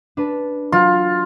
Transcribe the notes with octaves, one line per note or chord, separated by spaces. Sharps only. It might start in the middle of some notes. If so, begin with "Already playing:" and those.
D4 B4 A5
F#3 F4